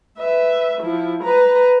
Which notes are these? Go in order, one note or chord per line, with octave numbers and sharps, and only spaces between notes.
B4 E5
F3 E4
B4 A#5